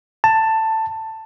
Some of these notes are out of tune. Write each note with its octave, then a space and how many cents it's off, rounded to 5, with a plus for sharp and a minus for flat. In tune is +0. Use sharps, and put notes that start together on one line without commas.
A5 +10